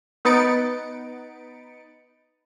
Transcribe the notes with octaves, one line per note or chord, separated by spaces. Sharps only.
B3 D#4 B4 A6 C#7 D7